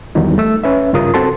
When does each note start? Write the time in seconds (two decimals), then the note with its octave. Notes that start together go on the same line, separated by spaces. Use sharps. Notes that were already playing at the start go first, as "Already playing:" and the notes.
0.15 E2 D#3 F#3 G3 D#4
0.38 A3 E6
0.64 C#4 B4 E5
0.93 G2 C#3 F4 A#4 D#6
1.14 C4 F#4 A4 A5 C6